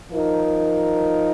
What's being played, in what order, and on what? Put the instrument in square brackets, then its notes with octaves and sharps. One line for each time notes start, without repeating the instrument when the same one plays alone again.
[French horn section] F3 D#4 A#4